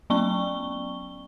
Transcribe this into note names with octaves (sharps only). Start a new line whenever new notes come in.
F#3 B3 C#4 C#6 G7